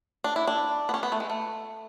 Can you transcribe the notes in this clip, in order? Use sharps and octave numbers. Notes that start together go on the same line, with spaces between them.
D4
E4
D4
B3
C#4
B3
A3
G#3
A3